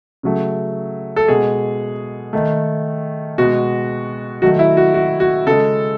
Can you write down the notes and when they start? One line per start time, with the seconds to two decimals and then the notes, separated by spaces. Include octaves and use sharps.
0.23 C#3 F#3 A3
1.16 A4
1.28 B2 G#3 G#4
2.33 D#3 A3
3.38 B2 G#3 F#4
4.42 D#3 F#3 A3 F#4
4.59 E4
4.77 F#4
4.94 F#4
5.20 F#4
5.46 C#3 G#3 A4